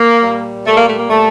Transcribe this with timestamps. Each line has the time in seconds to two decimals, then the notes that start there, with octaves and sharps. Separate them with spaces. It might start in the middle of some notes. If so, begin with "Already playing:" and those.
Already playing: A#3
0.23 A#2 G3
0.66 A#2 G3 A3
0.77 A#3
0.88 A3
0.98 A#3
1.10 A#2 G3 A3